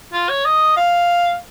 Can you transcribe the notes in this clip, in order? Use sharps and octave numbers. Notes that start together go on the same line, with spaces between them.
F4
C#5
D#5
F5